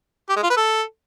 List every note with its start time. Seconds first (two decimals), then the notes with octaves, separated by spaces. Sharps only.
0.29 G4
0.36 G#3
0.43 F4
0.50 B4
0.57 A4